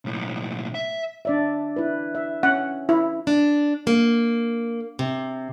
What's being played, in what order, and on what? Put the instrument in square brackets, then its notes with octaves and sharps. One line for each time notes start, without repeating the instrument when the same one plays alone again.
[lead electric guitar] B1 A2
E5
[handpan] D4 D5 E5
E4 B4
E5
[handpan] C#4 [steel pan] F#5
[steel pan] E4
[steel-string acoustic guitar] D4
A#3
C3